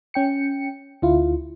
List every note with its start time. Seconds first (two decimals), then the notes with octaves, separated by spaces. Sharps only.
0.14 C#4 G5 C#7
1.02 D2 D3 E4 F4